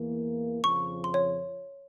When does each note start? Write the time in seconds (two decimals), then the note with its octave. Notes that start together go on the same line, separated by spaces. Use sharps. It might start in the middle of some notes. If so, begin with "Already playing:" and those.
Already playing: E2 E3 A#3
0.63 F2 C#3 F3 C#6
1.04 C6
1.14 C#5